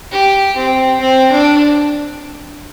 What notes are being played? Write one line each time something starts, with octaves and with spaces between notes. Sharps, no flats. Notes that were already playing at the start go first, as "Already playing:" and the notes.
G4
C4
C4
D4